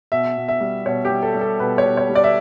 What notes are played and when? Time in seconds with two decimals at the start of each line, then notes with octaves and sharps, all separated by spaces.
0.12 B2 E5
0.37 B2
0.48 E5
0.61 G3
0.86 B2 C#5
1.05 G4
1.10 G3
1.23 A4
1.35 G3
1.41 A4
1.60 B2 B4
1.78 C#5
1.85 B2
1.97 C#5
2.09 G3
2.15 D5
2.24 E5